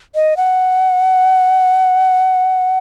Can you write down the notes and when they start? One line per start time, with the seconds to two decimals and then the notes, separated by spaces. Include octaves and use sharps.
0.15 D#5
0.37 F#5